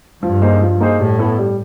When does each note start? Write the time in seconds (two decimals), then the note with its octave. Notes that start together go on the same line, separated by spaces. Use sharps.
0.23 G2 F3
0.42 A#3 D#4 G#4 C5
0.61 F3
0.80 A#3 D#4 G#4 C5
0.99 A2 G3
1.19 B3 E4 A4
1.38 G3